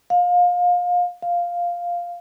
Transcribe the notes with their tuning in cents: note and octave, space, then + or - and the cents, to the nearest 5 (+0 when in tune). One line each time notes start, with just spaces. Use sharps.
F5 +30
F5 +0